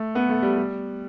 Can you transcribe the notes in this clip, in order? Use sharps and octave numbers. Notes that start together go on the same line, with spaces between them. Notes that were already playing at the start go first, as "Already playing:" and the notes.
Already playing: A3
B3
A3
G3
G3